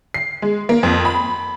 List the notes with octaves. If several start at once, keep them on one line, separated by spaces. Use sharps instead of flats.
C7
G#3
A#3
F2
B5